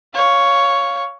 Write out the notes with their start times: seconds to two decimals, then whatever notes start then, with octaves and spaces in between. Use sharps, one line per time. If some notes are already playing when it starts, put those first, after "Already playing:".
0.14 C#5 F5